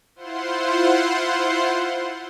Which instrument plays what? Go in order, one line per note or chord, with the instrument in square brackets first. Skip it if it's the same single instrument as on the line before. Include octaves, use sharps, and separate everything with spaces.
[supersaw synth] E4 F4 C5 F#5 C6